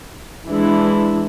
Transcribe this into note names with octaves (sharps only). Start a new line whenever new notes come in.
E3 G#3 D4 E4